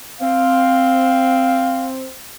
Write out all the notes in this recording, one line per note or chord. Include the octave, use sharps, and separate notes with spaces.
C4 F5